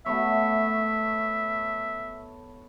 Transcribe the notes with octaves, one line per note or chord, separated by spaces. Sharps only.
A3 B3 C#5 E5